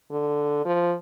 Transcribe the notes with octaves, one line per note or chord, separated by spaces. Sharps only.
D3
F3